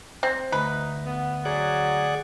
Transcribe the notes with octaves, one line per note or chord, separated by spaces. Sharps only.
C4
D2 D#4 B4
B3
F#3 G#4 D5 F#5